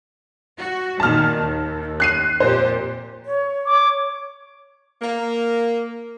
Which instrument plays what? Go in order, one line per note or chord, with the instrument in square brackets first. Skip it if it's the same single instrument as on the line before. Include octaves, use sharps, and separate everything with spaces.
[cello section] F#4
[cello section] A#2 D#3 [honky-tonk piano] A5 F6
[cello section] D#2
[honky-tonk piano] F#6 C7 D#7
[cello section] F2 A#2 G4 [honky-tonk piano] C5
[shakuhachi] C#5
[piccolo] D6
[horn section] A#3